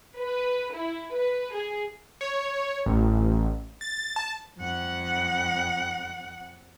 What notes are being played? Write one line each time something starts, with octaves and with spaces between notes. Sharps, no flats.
B4
E4
B4
G#4
C#5
A1
A6
A5
F2 F#5